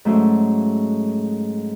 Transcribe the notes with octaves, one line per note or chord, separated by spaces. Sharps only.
G#2 F#3 A3 C#4